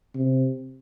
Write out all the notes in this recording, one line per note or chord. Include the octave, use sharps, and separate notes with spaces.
C3